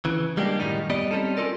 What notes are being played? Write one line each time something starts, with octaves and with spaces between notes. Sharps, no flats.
C#3 E3
G3 G#3 A#3 D4 G4
F#2 A2 D#3 G3 D#4
G3 B3 D5 D#5
G3 C4 C#4 D#4 A4
C#4 F4 F#4 A4 A#4 D5